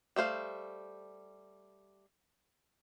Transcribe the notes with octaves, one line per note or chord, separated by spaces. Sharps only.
G3 A3 C5 F5